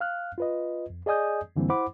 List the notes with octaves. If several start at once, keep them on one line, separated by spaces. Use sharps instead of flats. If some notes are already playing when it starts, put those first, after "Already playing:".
F5 F6 F#6
F4 B4 D#5
F2
G#4 D5 D#5 G#5 D#6 G6
F#2 D3 E3 G3 A#3 C4
E4 C5 F#5 B5 D6